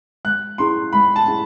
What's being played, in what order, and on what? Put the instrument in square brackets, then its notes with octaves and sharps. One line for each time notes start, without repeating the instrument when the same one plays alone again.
[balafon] G#3 [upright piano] F#6
[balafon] C#4 E4 G#4 [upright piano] C6
[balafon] G#3 [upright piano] B5
[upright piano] A5
[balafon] C#4 E4 G#4